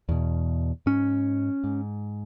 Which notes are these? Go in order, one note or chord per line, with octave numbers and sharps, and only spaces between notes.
E2 B2
G#2 C#4
G#2